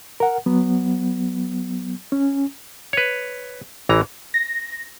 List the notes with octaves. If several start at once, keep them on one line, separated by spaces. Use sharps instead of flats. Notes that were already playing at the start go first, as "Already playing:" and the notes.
A#4 F#5
F#3 B3
C#4
B4 C#5
A1 E3 A#5
A#6